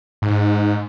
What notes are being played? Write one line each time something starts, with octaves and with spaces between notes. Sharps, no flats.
G#2